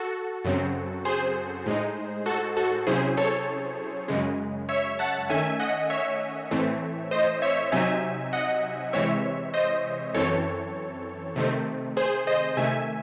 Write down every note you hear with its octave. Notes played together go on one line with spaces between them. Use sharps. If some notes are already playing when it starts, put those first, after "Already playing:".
Already playing: F#4 A4
F#2 C#3 F#3 C4
G#4 C5
A2 G#3 D#4
F#4 A4
F#4 A4
C3 F#3 C#4 E4 G#4 C5
A4 C#5
F#2 C#3 G#3
C#5 E5
F#5 A5
D#3 A3 C#4 E5 G#5
D#5 F#5
C#5 E5
A2 E3 A3 C4
C5 D#5
C#5 E5
C3 F#3 C4 D#4 E5 G#5
D#5 F#5
C3 E3 G#3 C4 C#5 E5
C5 D#5
F#2 E3 C4 A4 C#5
C3 D#3 A3 C4
G#4 C5
C5 D#5
C3 D#3 A3 E5 G#5